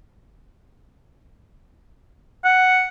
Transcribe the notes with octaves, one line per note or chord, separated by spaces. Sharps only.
F#5